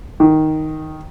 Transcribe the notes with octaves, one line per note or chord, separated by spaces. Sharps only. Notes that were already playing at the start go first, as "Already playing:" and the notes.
D#3